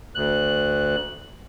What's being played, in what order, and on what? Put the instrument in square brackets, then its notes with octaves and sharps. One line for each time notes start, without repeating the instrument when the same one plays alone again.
[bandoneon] D2 F#6